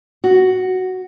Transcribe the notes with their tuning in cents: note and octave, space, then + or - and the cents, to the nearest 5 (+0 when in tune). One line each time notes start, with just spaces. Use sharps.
F#4 +5